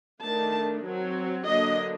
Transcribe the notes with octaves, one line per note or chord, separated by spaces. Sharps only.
D#3 A3 D4 A5
F#3 C4
D3 F#3 A#3 D4 D#5